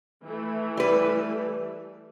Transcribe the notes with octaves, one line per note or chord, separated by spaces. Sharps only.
E3 A3
G3 B4